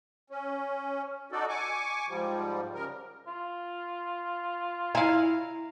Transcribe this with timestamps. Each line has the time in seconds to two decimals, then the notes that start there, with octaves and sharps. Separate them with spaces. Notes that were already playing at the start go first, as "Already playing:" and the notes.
0.30 C#4
1.32 D#4 F#4 A4 D5
1.49 G#5 C#6 D6
2.08 G#2 F3 G3
2.74 C#3 A#4
3.27 F4
4.95 E4 F5 G#5 A#5